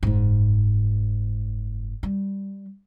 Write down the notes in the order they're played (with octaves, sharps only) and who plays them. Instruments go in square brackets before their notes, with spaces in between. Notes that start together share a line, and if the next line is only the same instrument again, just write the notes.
[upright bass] F#1 G#2
G3